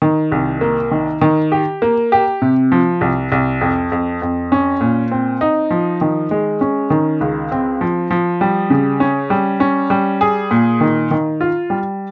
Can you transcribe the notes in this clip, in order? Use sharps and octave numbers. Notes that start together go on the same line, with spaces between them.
D#3
C2
A#3
D#3
D#3
G4
A#3
G4
C3
F3
C2
C2
F2
F2
F2
C#4
A#2
C4
D#4
F3
D#3
G#3
C#4
D#3
C#2
C4
F3
F3
G3
C#3
C#4
G3
C#4
G3
G#4
A#2
D#3
D#3
F4
G3